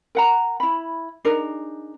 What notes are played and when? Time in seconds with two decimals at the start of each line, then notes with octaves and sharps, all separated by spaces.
0.15 A#4 F#5 A#5
0.60 E4 B5
1.25 D4 D#4 G#4 A#4